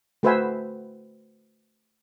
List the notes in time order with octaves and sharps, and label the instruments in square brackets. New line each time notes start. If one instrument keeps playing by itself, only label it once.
[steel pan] A3 F#4 B4 C5 E5 G#5